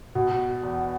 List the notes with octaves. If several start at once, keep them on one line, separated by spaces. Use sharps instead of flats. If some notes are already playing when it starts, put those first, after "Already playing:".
B2
E2